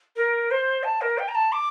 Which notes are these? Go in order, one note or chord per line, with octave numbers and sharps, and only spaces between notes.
A#4
C5
A5
A#4
G5
A#5
A5
D6